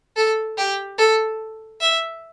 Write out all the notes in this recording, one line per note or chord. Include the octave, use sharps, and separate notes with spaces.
A4
G4
A4
E5